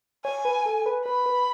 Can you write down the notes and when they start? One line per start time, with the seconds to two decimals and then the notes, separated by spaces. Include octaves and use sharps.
0.25 C#5 G#5
0.45 B4
0.66 A4
0.86 B4
1.06 B4 B5
1.26 B4